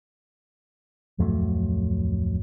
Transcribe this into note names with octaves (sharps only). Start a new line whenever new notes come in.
D1 F2 F#3 A3